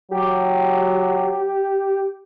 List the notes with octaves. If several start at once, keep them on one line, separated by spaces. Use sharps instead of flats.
F#3 G4